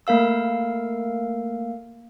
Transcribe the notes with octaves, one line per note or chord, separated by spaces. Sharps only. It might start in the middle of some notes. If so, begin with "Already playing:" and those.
A3 A#3 A#4 F5 E6